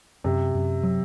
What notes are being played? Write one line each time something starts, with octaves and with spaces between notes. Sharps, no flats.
F#2 C3
F#2
F#3